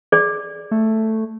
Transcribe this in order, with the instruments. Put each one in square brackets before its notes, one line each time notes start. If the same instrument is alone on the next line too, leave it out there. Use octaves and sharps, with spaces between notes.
[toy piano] G#4 D5
[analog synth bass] A3